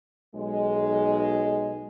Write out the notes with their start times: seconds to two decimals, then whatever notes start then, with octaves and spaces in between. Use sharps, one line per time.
0.35 B1 G#3